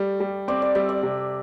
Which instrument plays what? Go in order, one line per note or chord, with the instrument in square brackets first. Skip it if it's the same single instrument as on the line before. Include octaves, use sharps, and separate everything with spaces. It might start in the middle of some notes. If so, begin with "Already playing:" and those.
Already playing: [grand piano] G3 [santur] A3
[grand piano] G3
[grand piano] C4 [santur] D5
[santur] D5
[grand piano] G3 [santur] E5
[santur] D5
[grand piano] C3